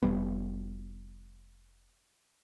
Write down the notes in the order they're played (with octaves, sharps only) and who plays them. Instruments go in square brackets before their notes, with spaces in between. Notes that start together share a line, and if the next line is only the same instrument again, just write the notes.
[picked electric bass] F1 F2 G3 B3